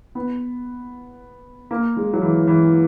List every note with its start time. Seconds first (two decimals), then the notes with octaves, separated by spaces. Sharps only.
0.15 B3
1.71 A#3
1.97 G#3
2.13 F#3
2.22 E3
2.47 E3